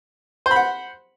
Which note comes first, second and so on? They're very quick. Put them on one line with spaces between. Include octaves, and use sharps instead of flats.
C5 B5 F#5